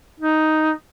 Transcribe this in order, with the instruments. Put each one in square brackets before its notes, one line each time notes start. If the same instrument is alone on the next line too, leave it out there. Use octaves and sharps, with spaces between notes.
[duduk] D#4